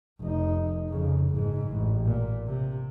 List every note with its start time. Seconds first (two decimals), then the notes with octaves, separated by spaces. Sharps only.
0.21 F1 D#4
0.89 F2 C#3
1.29 F#1 G#2
1.69 A1
2.05 A#2
2.47 C3